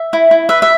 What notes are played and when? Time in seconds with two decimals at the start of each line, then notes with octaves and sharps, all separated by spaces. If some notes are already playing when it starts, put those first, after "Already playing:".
Already playing: E5
0.13 E4
0.31 E4
0.49 B4 E5
0.62 E5